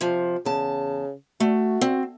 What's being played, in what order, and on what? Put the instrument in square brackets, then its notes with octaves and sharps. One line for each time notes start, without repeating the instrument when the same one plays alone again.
[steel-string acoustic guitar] C3 F3
[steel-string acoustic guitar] E2 A5 [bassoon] C#3
[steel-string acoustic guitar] A3 [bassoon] F#4
[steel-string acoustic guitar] C4